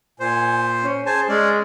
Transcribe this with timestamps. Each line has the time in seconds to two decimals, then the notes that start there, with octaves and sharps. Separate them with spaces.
0.20 A#2 C5 G#5
0.83 C#4
1.06 G#4 C5 G#5 A5
1.29 G#3 C#4 D5